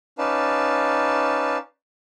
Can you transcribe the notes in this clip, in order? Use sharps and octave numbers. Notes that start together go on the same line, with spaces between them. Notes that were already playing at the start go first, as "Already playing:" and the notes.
C#4 D#4 B4 D5 F5 A5